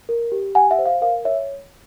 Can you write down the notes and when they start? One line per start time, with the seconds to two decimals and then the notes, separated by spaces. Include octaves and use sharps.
0.09 A#4
0.32 G4
0.55 G4 F#5 G#5
0.71 E5 F#5
0.79 C5
0.86 F5
1.02 A#4 F5
1.25 C#5 E5